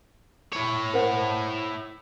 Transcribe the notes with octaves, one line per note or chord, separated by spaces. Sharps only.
E4 C#5
A#4 C5 F#5